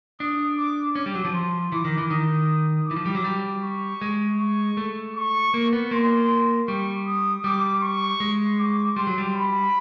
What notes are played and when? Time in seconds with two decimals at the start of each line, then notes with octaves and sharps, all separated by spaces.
0.20 D4 D#6
0.58 D6
0.95 C#4 D6
1.06 G3
1.15 F#3
1.25 F3
1.34 C6
1.72 E3 D6
1.85 D#3
1.98 E3
2.11 D#3 D#6
2.87 E3 D6
2.96 F3
3.06 G3
3.15 F#3
3.24 G3
3.63 C#6
4.01 G#3
4.39 C#6
4.77 A3
5.15 C#6
5.54 A#3
5.73 B3
5.91 A#3 C6
6.67 G3 C#6
7.06 D#6
7.44 G3 D6
7.83 C#6
8.20 G#3
8.59 D6
8.96 G3 C6
9.07 F#3
9.18 G3
9.35 B5